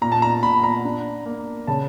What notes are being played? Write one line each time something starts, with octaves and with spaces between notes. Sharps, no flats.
A#2 A#5
A5
A#5
A#2 B5
A#5
D4
A#3
C#3 A5